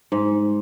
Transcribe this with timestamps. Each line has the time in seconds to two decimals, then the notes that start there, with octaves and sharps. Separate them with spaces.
0.12 G#2